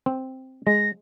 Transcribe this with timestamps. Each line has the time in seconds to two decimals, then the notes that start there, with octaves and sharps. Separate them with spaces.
0.06 C4
0.67 G#3 A#6